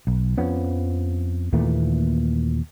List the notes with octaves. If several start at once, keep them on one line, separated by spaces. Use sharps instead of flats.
B1
F2 F3 B3 C#4
D#2 A#2 E3 A3